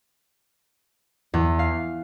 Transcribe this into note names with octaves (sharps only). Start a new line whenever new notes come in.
E2
F5